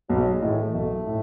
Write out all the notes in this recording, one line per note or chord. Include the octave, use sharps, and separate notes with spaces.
B1 F#3
G#3
A2 E3
A3
B1 A3
A2